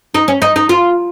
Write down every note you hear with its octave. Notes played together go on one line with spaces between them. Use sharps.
D#4
C#4
D#4
D#4
F4